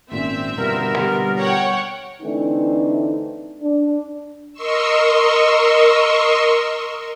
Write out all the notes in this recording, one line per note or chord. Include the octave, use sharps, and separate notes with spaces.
G#1 A#2 C4 C#4 E5
G2 B2 D3 B3 F4 A#4
B2 D3 G3
C#5 F#5 G5
D3 E3 A3 C4 D4 D#4
D4
A#4 D#5 C6 C#6 E6